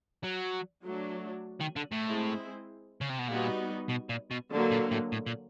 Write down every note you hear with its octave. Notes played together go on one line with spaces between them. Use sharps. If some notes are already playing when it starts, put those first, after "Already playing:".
F#3
F#3 A3 D4
D#3
D3
A2
G#3 C4 E4 G#4 C5
C#3
C3
B2
A#2 G3 B3 D#4 F#4
B2
A#2
B2
D3 F#3 A#3
A#2
A2
A2
A#2